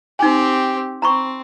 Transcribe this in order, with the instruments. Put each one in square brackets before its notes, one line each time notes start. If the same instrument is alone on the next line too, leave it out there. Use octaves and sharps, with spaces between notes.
[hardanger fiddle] C4 G4 [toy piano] D#4 G#5
[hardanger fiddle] C4 [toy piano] A#5 B5 C#6